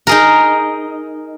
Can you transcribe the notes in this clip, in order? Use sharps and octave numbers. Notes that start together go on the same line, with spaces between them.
D#4 G#4 A#4